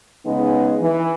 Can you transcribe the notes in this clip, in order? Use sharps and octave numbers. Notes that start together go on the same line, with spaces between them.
C#3 G#3 B3 D#4
E3